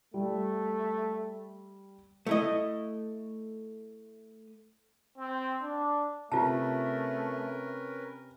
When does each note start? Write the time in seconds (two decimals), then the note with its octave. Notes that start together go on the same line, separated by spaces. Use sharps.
0.14 G3 A3
2.27 A3 E4 D#5
5.18 C4
5.62 D4
6.32 C3 A3 C#4 F4 A#4 B4 A5